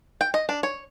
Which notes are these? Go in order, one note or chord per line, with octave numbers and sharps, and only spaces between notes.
G5
D#5
D4
C#5